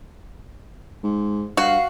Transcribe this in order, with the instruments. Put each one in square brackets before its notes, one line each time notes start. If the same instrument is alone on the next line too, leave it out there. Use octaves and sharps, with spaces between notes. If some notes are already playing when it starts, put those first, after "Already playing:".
[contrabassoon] G#2
[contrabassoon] G2 [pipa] F#4 [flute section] F5